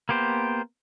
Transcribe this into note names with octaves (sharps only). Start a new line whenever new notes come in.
A#3 B3 G4 C5